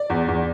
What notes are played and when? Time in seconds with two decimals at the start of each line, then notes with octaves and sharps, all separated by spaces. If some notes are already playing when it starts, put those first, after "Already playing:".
Already playing: D5
0.10 E2
0.28 E2